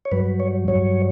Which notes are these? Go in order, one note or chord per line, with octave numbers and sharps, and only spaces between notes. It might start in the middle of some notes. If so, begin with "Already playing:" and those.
C#5
G2 F#3 B4
C#5
G2 F#3 C#5